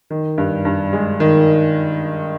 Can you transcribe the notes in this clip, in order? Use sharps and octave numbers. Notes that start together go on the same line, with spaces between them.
D#3
G2
G2
G#3
D#3